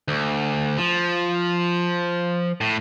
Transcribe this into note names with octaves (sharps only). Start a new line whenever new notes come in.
D2
F3
A2